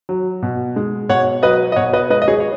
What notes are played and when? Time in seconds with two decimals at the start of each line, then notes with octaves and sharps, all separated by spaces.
0.09 F#3
0.42 B2
0.76 G#3
1.09 B2 C#5 F#5
1.43 F#3 B4 D#5
1.72 D#5
1.76 B2 C#5 F#5
1.93 B4 D#5
2.10 G#3 B4 D#5
2.22 D#5
2.28 G#4 C#5
2.40 C#5